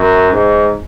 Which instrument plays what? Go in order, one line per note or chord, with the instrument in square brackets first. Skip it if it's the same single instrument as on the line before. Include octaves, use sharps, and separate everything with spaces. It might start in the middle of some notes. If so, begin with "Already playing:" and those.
Already playing: [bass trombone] F#2
G#2